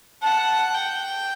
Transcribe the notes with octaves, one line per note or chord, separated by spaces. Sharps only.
F#5 A5
G5